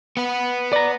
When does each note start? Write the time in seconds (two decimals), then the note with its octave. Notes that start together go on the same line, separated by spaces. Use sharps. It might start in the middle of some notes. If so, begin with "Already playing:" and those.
0.17 B3 F#5
0.73 D5 A#5